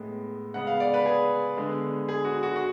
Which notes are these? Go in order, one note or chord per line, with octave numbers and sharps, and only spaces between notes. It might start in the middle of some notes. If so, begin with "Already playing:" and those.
Already playing: A2 G#3 B3
C#3 G#3 B3 F#5
F5
D5
B4
G#4
D3 G#3 B3
G#4
F#4
F#4
F#4